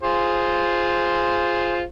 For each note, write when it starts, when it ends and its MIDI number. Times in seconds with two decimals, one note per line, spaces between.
0.03 1.83 65
0.03 1.83 68
0.03 1.83 72